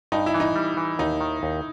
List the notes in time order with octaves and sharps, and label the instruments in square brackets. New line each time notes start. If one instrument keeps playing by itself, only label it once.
[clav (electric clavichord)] G2 [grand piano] D#4
[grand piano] E4
[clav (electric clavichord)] E3
[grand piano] D#4
[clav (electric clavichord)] G3
E3
[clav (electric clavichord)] D#2 [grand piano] D#4
[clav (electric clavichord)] D#3
D#2